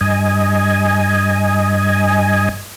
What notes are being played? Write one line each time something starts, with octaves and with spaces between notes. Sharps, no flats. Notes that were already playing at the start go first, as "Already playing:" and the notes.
G2 D#5 G#5